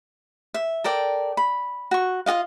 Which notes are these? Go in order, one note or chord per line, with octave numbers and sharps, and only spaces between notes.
E5
A4 A#4 D5 G5
B5
F#4 C#6
F4 F#4 D#5 F5